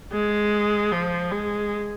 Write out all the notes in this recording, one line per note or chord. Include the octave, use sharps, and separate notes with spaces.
G#3
F3
G#3